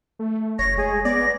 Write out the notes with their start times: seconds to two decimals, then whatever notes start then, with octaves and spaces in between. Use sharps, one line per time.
0.19 A3
0.59 F#1 C#5 A#6
0.77 G#3 G#4
1.05 B3 D5 A#6